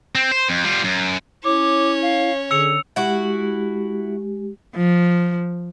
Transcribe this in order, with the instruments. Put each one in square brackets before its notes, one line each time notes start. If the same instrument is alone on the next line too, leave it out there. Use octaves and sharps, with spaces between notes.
[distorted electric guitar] C4
C5
F2
G3 F4
F#2
[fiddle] C#4 C#5 [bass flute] E4 [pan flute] D6
[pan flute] F5
[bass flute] D3 [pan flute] G#4 [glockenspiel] E6 C#7 F7
[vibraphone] G#3 G4 [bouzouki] E4 F#4
[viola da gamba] F3